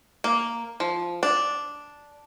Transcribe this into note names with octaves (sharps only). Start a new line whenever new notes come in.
A#3
F3
D4